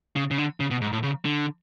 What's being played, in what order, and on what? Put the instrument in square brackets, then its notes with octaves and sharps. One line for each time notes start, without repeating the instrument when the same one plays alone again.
[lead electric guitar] C#3
C#3
D3
C#3
B2
G#2
A2
C#3
D3